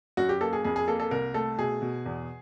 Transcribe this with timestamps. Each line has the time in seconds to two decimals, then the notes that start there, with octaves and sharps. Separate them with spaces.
0.17 F#2 F#4
0.29 G4
0.41 A#3 A4
0.53 G#4
0.64 F2 G#4
0.76 G#4
0.88 A#3 A4
1.00 A4
1.11 C2 A#4
1.34 A3 A4
1.58 B2 G#4
1.82 B2
2.06 E2